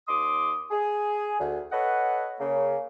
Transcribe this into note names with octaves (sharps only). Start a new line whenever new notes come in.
D#2 C6 D6 D#6
G#4
D2
A4 B4 C#5 D#5 F#5
C#3 A#3